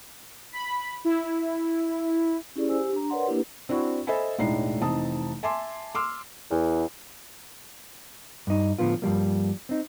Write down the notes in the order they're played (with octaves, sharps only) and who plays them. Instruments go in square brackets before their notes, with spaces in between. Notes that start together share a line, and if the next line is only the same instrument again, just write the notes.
[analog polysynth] B5
E4
[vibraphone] C#4 E4 G4 G#4 D5
C5 G#5 E6
G4
D4 A#5
A#4 B4 C#5 D5 F#5 C6
A#3 D4 E4 G4 B4
[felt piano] C4 D4 E4 F#4
A4 C5 D#5 E5 G#5 B5
E1 A2 G#3 D4 D#4 C7
F1 E3 C4 D#4 A5 D#6
E5 G#5 A5 C6 D6
C6 D6 E6 F6
[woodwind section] E2
[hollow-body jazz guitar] G2 D#4
A2 D3 F3 B3 F4
G2 F3 G3 A#3
C4 D#4